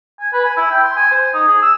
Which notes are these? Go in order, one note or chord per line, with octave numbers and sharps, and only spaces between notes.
G#5
B4
G#5
E4
G5
C6
G#5
C5
D#4
G#4
E6